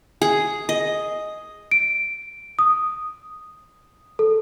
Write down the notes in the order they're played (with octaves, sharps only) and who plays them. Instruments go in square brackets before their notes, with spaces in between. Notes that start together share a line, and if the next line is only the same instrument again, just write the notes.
[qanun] G#4
D#5
[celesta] D7
D#6
A4